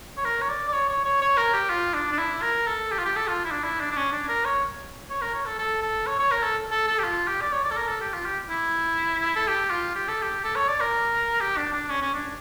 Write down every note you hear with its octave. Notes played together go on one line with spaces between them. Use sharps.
C#5
A#4
C#5
D5
D5
C#5
C#5
C#5
C#5
A#4
G4
F4
D4
D4
E4
A#4
A4
G4
F4
G4
A4
F4
E4
D4
E4
D4
D4
C#4
D4
A#4
C#5
C#5
A#4
C#5
A4
A4
A4
C#5
C#5
A#4
A4
A4
A4
G4
F4
G4
D5
C#5
D5
A4
A#4
A4
G4
F4
G4
E4
A4
G4
F4
G4
A4
G4
A4
C#5
D5
A#4
G4
D4
D4
C#4
C#4
D4